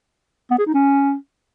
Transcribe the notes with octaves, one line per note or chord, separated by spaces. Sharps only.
B3
G#4
D#4
C#4